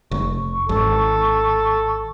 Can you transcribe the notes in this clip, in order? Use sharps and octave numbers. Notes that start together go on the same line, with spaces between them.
F1 C#6
G#1 A4